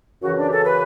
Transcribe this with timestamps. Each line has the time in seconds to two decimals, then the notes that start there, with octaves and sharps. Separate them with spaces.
0.22 F#2 C#3 E3 F#4
0.37 D4
0.46 G4
0.51 A4
0.65 B4